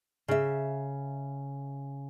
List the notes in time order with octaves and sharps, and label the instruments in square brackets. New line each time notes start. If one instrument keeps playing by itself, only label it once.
[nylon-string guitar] C#3 E5